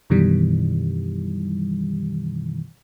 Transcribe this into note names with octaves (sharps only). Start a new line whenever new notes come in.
F#2 B2 D#3 E3 G3